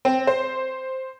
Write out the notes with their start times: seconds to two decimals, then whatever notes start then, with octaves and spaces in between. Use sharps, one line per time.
0.05 C4
0.27 C5